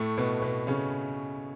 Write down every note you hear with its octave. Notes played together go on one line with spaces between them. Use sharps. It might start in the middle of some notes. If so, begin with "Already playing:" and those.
Already playing: A2 A3
B2 B3
B2 B3
C#3 C#4